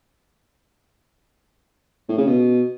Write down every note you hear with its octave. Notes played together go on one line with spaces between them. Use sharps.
A2
C#3
B2